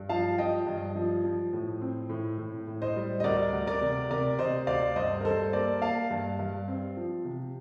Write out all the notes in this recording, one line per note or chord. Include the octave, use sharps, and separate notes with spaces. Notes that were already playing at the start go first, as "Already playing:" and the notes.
Already playing: G2
F3 F5 A5
F3 D#5 G5
G2
F3
F3
A2
C4
A2
A2
A2
C5 D#5
G3
D#5
D2 A#4 D5
D2
A#4 D5
C3
C3 A#4 D5
C3 C5 D#5
D2 D5 F5
G2 C5 D#5
A#4
G2 A4 C5
A#3 A#4 D5
A#3 F5 A5
G2
G2
C4
F3
C3